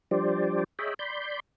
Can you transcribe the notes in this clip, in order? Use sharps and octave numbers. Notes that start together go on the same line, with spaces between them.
F3 G3 D4 G4 C5 D5
G#4 C#5 D#5 E5 G5 B5
D5 B5 C6 G6